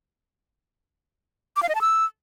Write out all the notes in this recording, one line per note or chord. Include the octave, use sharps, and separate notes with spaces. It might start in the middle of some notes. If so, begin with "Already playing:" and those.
D6
F5
D#5
A5
E6